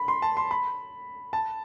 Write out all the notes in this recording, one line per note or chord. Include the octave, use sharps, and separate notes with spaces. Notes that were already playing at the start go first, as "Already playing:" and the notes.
Already playing: B5
C6
A5
C6
B5
A5